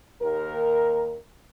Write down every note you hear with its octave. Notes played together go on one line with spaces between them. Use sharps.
D#2 A#4